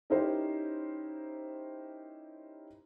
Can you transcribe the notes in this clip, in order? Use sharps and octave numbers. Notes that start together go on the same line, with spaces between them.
C#4 D#4 E4 G4 A#4 C5